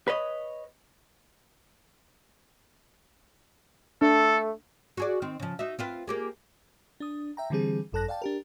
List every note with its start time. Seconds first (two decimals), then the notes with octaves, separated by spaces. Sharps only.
0.08 B4 C#5 D#5
4.02 A3 D4 A4
4.97 F#4 G#4 D5
5.22 D#3 C4
5.40 C#3 F3
5.59 D#4 F#4 E5
5.79 C4 F4 B4
6.07 A#3 G4 G#4
7.00 D4 D#6
7.37 E5 G5 A#5
7.50 D3 E3 G3 C4 G#4
7.92 G#1 F#2 A4 A5 F#6 A#6
8.08 D5 F5 G5 A5
8.22 D4 G4 A#4